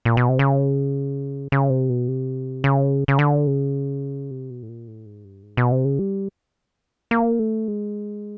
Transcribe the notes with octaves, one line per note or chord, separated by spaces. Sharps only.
A#2
B2
C3
C#3
C#3
C3
B2
C3
C#3
C#3
D3
C#3
C3
B2
A2
A#2
A2
G#2
G2
G#2
B2
C3
C#3
G3
A#3
A3
G#3